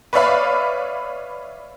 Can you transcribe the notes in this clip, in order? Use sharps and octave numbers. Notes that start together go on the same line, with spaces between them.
B4 C#5 D5 E5 F5 B5